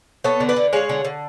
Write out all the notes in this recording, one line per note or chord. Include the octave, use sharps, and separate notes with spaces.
B3 A4 C#5
D3
B4 D5
D3
G#3 C#5 F5
D3
D3